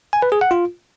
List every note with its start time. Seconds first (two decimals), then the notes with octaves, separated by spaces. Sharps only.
0.13 G#5
0.22 B4
0.32 G#4
0.41 F#5
0.51 F4